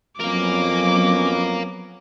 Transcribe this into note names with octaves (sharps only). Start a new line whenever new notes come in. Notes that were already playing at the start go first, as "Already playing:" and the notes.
F2 F#3 B3 C#4 A#4 F5 D6